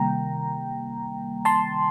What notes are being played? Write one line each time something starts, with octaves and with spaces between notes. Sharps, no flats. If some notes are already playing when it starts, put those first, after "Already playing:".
Already playing: C3 D#3 G3 A#3 G5 A#5
A5 C6